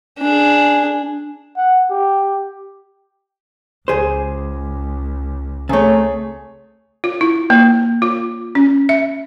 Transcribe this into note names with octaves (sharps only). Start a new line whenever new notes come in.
D4 G#4
F#5
G4
C#2 G#4 C5
C3 A3 G#4 C#5
F4
E4
A#3
F4
C#4
E5